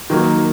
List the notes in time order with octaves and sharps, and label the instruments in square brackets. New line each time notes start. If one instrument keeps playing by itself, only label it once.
[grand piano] D#3 F#3 A#3